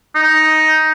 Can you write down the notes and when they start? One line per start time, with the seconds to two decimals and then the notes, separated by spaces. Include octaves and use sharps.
0.15 D#4